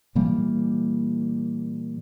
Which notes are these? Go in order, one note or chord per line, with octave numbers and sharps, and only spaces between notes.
A#2 E3 G3 A#3